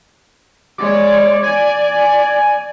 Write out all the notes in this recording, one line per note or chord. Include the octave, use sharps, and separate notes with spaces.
G#3 C#5 D5
D5 G#5